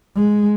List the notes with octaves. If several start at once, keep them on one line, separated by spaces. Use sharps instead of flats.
G#3